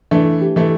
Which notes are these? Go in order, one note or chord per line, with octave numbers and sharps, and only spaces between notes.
E3 A3 D4
G4
E3 A3